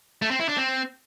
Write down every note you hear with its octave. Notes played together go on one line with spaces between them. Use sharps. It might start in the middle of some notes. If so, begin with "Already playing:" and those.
A3
C4
E4
D4
C4